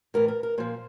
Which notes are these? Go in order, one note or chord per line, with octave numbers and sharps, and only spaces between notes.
A2 E3 A#4
A#4
A#4
A#2 F3 C5